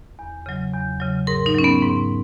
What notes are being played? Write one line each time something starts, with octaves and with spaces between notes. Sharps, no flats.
E2
C#3 F#3
E2
C#3 F#3
G#2 A#4
D#4
F#3 C#4
B3
G#2